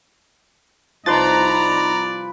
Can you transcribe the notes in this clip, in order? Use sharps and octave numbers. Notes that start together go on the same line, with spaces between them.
C2 F3 D#4 B4 D5 A#5 C6 A6